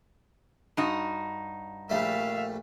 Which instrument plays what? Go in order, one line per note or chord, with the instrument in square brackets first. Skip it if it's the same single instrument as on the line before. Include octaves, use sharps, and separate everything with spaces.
[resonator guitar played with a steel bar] G2 D#4 F#4
[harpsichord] A#1 G3 A3 [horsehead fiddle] E5 F5